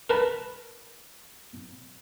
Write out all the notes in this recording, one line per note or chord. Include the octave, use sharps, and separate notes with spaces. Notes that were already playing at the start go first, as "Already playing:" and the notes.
A#4 B4 A5